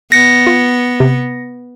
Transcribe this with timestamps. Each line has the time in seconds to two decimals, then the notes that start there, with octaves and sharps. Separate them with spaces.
0.12 B3 A#6 C#7
0.47 F4
1.00 C3